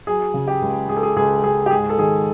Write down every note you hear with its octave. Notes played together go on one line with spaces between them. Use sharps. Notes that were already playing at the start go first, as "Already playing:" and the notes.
F#3 G#4
C#3
G4
C#2
C#2 G#4
A4
G#4
C#2 G#4
C#2 G#4
G4
G#2 G#4
A4
D#3 G#4